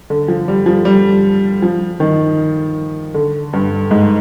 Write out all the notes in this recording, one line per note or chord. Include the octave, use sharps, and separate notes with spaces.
D3
F3
G3
F3
G3
F3
D#3
D3
G2
G#2